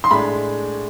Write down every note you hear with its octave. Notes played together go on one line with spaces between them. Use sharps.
C6
A2 G#3 D4 B5